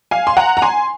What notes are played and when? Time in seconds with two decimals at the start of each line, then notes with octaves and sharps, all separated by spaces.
0.11 F5 G#5
0.27 C6
0.37 F#5 A#5
0.57 A#5
0.62 G#5 C6